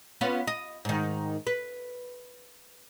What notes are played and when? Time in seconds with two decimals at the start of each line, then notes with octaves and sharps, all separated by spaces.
0.21 B3 C#4 F4
0.47 D#5
0.85 G#2 D#3
1.47 B4